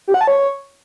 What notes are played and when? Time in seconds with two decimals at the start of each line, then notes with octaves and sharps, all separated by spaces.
0.08 G4
0.14 F#5
0.21 A5
0.27 C#5